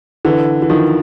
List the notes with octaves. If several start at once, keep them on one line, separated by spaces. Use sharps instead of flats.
D3 E3
E3
D#3 F3